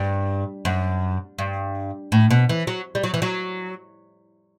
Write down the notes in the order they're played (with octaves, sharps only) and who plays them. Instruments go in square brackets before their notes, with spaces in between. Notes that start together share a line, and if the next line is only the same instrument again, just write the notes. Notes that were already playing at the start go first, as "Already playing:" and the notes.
Already playing: [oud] G2
F#2
G2
A2
B2
E3
F#3
G3
F#3
E3
F#3